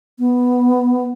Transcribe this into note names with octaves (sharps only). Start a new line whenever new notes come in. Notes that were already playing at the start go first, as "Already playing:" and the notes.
B3